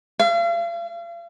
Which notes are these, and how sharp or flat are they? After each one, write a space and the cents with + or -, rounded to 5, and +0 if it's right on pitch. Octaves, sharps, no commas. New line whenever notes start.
F5 -40